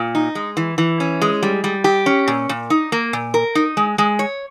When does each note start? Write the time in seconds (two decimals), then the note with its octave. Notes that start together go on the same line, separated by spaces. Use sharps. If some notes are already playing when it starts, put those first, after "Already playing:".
Already playing: A#2
0.15 D#4
0.35 G#3
0.57 E3
0.78 E3
1.00 C#4
1.22 G#3
1.43 G3
1.64 G3
1.84 G4
2.06 C#4
2.28 A#2
2.49 A#2
2.70 D#4
2.92 A#3
3.13 A#2
3.34 A#4
3.55 D#4
3.77 G#3
3.98 G#3
4.19 C#5